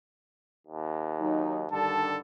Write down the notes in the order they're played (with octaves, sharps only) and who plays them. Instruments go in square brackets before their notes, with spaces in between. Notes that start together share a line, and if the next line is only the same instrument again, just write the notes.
[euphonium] D#2
[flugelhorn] F#3 [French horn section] D#4
[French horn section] G2 D#3 G3 [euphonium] D3 [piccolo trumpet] A4 [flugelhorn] A5